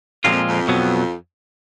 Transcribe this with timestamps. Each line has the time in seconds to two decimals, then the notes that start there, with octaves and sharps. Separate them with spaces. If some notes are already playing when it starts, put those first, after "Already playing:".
0.24 F#2 A#2 F3 G#3 C4 F4
0.32 F2
0.49 F2
0.68 B2 F#3 B3